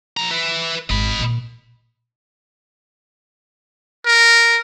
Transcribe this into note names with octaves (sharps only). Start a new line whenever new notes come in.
F3 A#5
B4 E5
G#1 D#5 B5
A#2 D#3
A#4